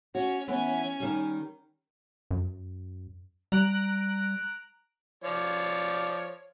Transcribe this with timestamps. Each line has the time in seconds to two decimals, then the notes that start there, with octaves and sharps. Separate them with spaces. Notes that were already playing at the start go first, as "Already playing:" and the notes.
0.15 C#4 F#4 C#5
0.48 E3 B3 C#4 G#5
1.00 D#3 G3
2.31 F#2
3.52 G3 A#5 F#6 D7
5.24 F3 C#5 D5